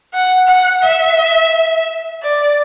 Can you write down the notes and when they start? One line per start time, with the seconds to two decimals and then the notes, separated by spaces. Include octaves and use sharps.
0.14 F#5
0.48 F#5
0.82 E5
2.23 D5